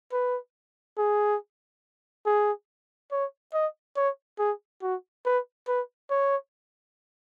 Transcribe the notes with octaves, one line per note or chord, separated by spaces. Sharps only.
B4
G#4
G#4
C#5
D#5
C#5
G#4
F#4
B4
B4
C#5